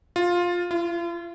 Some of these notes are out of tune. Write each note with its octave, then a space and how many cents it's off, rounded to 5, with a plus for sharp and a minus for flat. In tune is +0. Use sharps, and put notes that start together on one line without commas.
F4 +10
F4 -40